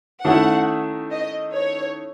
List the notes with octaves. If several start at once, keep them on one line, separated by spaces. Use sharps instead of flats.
D#3 A3 C#4 E4 F#5
D#5
C#5